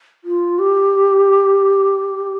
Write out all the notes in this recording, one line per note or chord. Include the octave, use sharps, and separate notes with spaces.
F4
G4